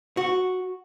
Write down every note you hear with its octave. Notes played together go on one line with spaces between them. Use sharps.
F#4